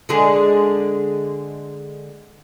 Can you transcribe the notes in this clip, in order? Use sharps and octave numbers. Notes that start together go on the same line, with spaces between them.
D3 G#3 G#4